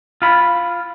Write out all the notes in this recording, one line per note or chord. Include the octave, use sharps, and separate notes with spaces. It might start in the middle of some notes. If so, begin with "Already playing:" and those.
F4 B5